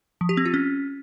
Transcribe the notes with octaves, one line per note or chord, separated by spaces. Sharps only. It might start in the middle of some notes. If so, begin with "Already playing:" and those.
F3
G4
C4
F4
C#4